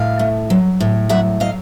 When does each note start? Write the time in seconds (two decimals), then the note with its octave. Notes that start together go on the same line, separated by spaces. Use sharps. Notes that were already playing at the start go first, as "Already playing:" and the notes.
Already playing: A2 F5
0.19 A3
0.50 F#3
0.80 A2
1.09 F#3 E5 F#5
1.40 F#3 D#5 F5